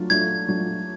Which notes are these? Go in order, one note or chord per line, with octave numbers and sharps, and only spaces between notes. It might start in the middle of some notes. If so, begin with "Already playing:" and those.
Already playing: F#3 A3 D4 F4
F#3 A3 D4 F4 G#6
F#3 A3 D4 F4